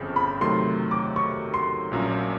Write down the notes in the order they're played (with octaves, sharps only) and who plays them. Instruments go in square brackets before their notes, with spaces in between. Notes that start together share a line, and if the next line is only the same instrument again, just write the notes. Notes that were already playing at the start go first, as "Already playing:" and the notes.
Already playing: [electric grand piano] G1 F2 C#3
[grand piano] B5
[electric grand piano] C3 D#3 F#3 A3 [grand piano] C6
[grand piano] D6
C#6
C6
[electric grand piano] A#1 A#2 F#3 A#3 C#4